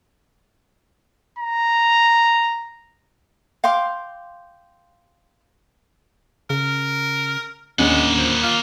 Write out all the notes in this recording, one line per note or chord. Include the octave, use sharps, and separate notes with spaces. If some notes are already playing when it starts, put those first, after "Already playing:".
A#5
F5 G5 C6 D6
C#3 A#4
D1 D#2 G#3 A#3 C#4 D4 F#5
F3
F4